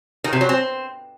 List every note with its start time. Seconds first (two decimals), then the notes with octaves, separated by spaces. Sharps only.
0.24 D#3
0.33 C3
0.41 F#3
0.49 C4